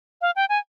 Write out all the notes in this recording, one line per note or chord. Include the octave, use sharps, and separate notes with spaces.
F5
G5
G#5